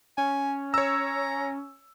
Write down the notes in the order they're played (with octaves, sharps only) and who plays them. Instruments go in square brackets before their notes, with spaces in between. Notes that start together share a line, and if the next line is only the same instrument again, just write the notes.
[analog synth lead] C#4 [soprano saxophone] G#5
[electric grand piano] C#5 E6 [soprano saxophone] A#5